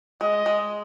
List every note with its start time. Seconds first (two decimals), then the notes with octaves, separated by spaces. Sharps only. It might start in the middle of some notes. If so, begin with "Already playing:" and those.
0.21 G#3 D#5
0.46 G#3